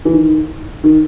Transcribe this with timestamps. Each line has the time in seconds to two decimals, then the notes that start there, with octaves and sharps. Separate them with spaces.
0.05 E3
0.13 D#3
0.84 D#3